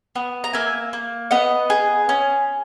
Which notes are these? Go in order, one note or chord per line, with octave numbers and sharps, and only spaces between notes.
B3
A#5
A#3 E5 G#5
A#3
B3 D#5 F#5
G#4
C#4